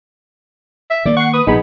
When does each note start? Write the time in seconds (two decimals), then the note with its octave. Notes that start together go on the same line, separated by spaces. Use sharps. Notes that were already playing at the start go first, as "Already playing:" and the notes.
0.90 E5
1.05 D#3 A#3 D5
1.17 F#5 C#6 C7
1.33 B4 D#6
1.47 E1 A#1 B3 D#4 G#4 B5